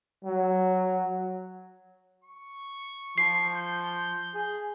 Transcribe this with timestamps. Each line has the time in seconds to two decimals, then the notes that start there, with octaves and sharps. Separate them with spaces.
0.25 F#3
2.24 C#6
3.18 F3 C7
3.54 G6
4.35 G#4